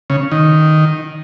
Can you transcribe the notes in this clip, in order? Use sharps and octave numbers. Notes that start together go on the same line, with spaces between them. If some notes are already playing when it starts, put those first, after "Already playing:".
C#3
D#3